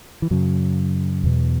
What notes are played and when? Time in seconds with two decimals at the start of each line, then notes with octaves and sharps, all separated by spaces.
0.22 E3
0.31 F#2 C#3 F#3
1.23 E2 B2